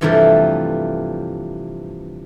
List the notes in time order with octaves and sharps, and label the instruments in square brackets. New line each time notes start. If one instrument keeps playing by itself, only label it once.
[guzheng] G2 C3 E3 F3 G3 A3